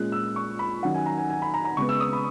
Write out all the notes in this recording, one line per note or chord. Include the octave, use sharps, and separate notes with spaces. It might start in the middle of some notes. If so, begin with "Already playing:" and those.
Already playing: A#2 G#3 C#4 F#6
E6
C#6
B5
D#3 F#3 C#4 F#5
G#5
A#5
G#5
G#5
B5
A#5
A#5
C#3 G#3 B3 C#6
E6
D#6
B5